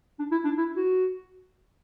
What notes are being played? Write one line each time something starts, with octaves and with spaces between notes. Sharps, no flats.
D4
E4
D4
E4
F#4